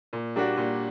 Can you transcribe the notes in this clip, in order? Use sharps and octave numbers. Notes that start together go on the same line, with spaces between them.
A#2
G3 A#3 D4 F#4
A#2